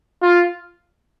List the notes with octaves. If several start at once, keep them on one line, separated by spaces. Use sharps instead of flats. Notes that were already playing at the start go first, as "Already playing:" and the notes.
F4